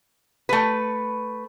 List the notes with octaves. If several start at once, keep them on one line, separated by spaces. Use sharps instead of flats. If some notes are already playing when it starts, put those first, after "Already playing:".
A3 B4